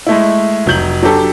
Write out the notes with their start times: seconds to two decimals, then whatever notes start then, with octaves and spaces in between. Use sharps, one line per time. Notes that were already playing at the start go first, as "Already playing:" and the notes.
0.07 G#3 A3 E4
0.66 F1 F#3 G6 F#7
1.03 F#3 D4 G4 A4